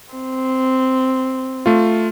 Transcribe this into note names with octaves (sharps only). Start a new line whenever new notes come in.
C4
A3 F4